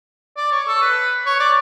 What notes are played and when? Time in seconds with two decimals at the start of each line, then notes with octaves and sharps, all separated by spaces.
0.37 D5
0.52 C#5
0.67 A4
0.82 B4
1.26 C#5
1.40 D5